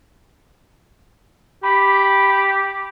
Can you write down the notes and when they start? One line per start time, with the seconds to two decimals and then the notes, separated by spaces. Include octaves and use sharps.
1.63 G4 B5